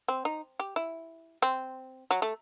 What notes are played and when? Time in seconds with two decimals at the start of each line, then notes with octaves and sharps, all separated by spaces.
0.08 C4
0.25 D#4
0.60 G4
0.76 E4
1.42 C4
2.11 F#3
2.22 A3